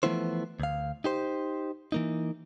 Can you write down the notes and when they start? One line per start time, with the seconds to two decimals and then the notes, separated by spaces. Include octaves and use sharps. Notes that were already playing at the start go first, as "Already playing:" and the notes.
0.03 E3 F3 A3 B3 E4 C5
0.60 D2 F5
1.04 D#4 G4 C5
1.92 E3 A#3 D#4